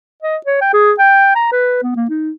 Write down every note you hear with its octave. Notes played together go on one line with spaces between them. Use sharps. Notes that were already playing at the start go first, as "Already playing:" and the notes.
D#5
C#5
G5
G#4
G5
A#5
B4
B3
A#3
D#4